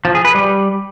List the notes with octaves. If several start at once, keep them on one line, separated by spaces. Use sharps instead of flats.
F3
G#4
B4
G3